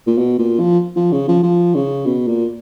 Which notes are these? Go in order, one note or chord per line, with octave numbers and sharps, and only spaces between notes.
A#2
B2
A#2
F3
F3
C#3
F3
F3
C#3
B2
A#2